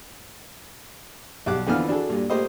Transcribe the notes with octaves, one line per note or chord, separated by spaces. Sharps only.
B1 G3 D6 F#6
F2 D3 E3 B3 F4 F6
D4 F#4 G#4 A4
G2 A#2
A#2 A3 A#3 G4 C5 D#5